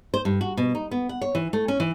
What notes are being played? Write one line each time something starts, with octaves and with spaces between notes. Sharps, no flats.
C5
G2
F#4
B2
D#4
B3
F#5
C#5
E3
A3
C#4
E3